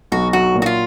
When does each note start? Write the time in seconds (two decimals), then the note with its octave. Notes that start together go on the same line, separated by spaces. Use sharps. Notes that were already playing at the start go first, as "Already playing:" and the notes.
0.12 B1 F#4
0.33 F#3 F#4
0.55 A#2
0.62 F#4
0.66 F4